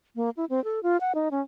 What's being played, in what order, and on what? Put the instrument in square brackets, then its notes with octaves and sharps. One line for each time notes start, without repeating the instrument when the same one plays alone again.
[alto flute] A#3
E4
C4
A4
F4
F#5
D#4
C#4